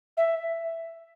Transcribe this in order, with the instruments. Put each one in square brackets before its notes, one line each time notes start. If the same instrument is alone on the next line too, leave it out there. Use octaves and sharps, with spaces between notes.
[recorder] E5